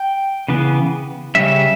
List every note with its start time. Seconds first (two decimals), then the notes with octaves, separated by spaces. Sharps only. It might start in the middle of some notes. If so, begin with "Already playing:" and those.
Already playing: G5
0.48 C#3 E3 B3
1.35 C#3 G3 C#4 E5